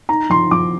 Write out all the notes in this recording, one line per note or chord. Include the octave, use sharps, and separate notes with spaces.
D#4 A#5
F3 C6
F3 D6